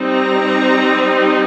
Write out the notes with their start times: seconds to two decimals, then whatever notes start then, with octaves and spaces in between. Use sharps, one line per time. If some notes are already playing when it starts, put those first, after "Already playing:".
Already playing: G3 C4 D#4
0.11 A#5